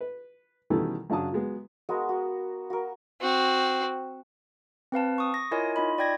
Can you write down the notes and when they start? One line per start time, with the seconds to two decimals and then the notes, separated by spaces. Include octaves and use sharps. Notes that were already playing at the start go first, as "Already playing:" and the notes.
0.01 B4
0.70 B2 D#3 E3 G3 C#4 A4
1.10 F#2 C#3 D4 F#4 A5 D#6
1.32 F#3 G#3 B3
1.89 G#3 B3 F#4 A#4
2.09 F#4
2.70 F#4 A#4
3.21 C4 F#4
4.92 C4 B4 F5 A5
5.18 C#6 D#6
5.34 A#6
5.51 E4 F4 A#4 C#5 D#5 G#5
5.76 D#4 F4 D#5 B5
5.98 D5 G5 G#6 A#6